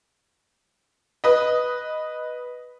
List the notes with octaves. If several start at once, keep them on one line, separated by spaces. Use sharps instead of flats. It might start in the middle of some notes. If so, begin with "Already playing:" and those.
B4 D#5